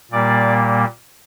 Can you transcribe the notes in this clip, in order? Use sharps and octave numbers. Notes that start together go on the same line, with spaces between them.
A#2 G3 A#3 D5